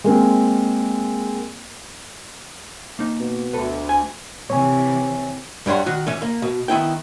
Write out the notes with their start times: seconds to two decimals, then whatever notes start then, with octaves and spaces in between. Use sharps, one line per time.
0.04 G#3 A#3 C4
2.99 A#3 D#4
3.20 B2
3.53 D2 A4 B4
3.89 G#5
4.50 C3 E3 C#5 G#5
5.66 G2 G3 C#5 F#5 C6
5.86 D#3 F#4
6.07 E3 C#4
6.22 A#3
6.42 B2
6.68 D#3 B3 E4 G5